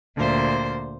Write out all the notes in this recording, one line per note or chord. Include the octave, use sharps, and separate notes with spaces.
D2 A#2 C5